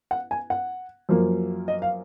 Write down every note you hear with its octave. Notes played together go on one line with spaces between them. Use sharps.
F#5
G#5
F#5
F#2 F3 A#3
D#5
F5